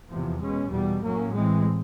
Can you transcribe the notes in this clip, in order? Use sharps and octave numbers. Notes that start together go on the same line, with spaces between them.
E2 C3 F3
B2 G#3 C#4
E2 B2 G3
A2 F#3 A#3 C#4
A2 E3 G#3 C4